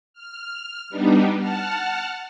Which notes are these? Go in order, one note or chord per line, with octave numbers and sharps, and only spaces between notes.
F6
G3 B3 D4 D#4
F#5 A5 F6